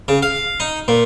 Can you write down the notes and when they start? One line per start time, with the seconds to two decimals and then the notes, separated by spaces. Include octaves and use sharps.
0.08 C#3
0.23 F5
0.60 D#4
0.88 A#2